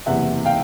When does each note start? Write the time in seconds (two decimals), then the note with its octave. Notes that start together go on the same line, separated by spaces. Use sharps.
0.06 F#1 E2 C3 E3 E5 F#5
0.45 F5 G5